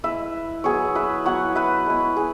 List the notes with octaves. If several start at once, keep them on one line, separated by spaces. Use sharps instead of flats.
G#3 E4 B4 E5
F#3 B3 E4 G#4 C#5
B4 E5
F#3 B3 E4 C#5 F#5
B4 E5
G#3 B3 E4
G#4